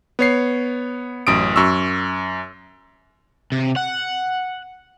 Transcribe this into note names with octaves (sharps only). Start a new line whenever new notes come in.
B3 C#5 C7
A1 F#2 D#6 D7
F#2 C#6 E6
C3
F#5